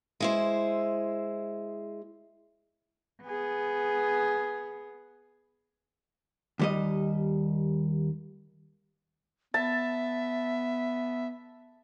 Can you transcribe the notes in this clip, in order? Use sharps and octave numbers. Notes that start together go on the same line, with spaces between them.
G#3 E4 C5
B3 G#4
D#2 G3 D#5
B3 E5 A5